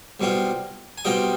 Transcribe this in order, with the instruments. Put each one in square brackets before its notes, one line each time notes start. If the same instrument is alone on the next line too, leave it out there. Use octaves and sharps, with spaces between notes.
[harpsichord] C2 B2 G3 C4 F4
G#5
C2 B2 G3 C4 F4 D#5 G5